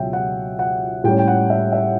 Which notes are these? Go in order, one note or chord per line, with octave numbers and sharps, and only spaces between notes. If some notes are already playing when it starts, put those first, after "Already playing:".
Already playing: C#2 B2 F#3 C#4 E5 G5
F#5
F#5
A2 G3 C#4 G5
G5
F#5
E5
E5